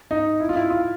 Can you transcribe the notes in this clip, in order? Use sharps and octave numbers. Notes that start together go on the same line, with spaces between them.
D#4
E4
F4
E4
F4